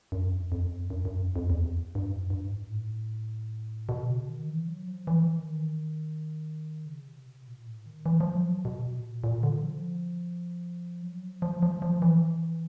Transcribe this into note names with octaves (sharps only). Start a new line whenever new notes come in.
F#2
F2
F2
F#2
F#2
F#2
F2
F2
E2
F2
G2
F#2
G2
G#2
A2
B2
C#3
D#3
E3
F#3
F3
E3
D#3
C#3
C3
B2
A#2
A2
D#3
E3
F3
F#3
B2
A#2
A#2
D3
F3
F#3
F3
F3
F3
F3
E3